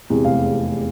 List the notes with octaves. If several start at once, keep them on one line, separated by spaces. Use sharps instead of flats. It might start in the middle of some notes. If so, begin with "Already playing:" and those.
E2 C3 G#3
F1 F5